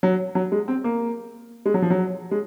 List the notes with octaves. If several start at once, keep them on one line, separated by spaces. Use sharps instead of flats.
F#3
F#3
G#3
C4
A#3
G#3
F#3
F3
F#3
G#3